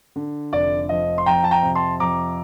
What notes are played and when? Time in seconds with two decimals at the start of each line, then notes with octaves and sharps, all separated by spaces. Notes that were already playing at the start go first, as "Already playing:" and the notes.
0.16 D3
0.53 F1 D5
0.89 F3 D#5
1.18 C6
1.26 F2 G5 A#5
1.44 A5
1.51 G5 A#5
1.63 C3
1.75 A5 C6
2.00 F2 A#5 D6